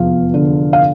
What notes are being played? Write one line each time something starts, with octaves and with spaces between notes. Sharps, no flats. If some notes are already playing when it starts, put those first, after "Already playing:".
Already playing: F1 E2 F3 F5
D3
F5